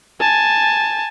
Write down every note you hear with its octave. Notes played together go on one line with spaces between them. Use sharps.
G#5 A5